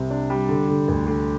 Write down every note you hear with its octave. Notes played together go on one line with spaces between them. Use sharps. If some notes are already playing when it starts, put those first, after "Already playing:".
Already playing: C2 C3
D4
G3
D3
D3
D2
D3